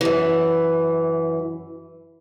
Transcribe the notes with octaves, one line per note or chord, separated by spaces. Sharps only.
F#2 E3